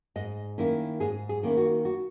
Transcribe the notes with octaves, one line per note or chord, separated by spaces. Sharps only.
G#2 D#5
D#3 A#3 C#4 E4
G#2 G#4
G#4
D#3 A#3 C#4 E4
F#4
F#4